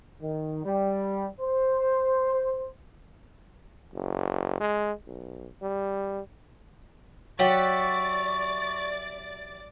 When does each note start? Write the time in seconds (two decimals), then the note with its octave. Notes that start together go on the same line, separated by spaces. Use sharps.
0.21 D#3
0.65 G3
1.40 C5
3.93 F#1
4.60 G#3
5.07 B1
5.62 G3
7.39 F#3 G4 D5 E5 F#5 C#6 A6